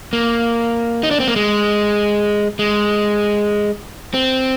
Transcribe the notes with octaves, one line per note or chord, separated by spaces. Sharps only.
A#3
D#4
D4
C4
A#3
G#3
G#3
C4